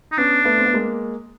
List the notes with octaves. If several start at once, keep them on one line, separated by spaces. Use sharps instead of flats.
D#4
B3 C#4 D4
A3 B3
C4
B3
G#3 A#3